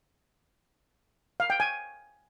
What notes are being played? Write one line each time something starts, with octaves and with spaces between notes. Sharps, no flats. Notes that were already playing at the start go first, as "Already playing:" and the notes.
F5
G5
G#5